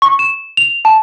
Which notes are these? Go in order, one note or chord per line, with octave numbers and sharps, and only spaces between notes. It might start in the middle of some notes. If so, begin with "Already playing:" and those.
C#6
E7
F7
A5